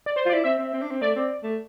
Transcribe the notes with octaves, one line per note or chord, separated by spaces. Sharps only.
D5
C5
F4
E4 D5
C4 E5
C4
C4
D4
C4
A3 D5
C4
A3